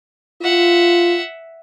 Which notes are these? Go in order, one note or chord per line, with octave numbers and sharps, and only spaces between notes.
F4 E5 F#5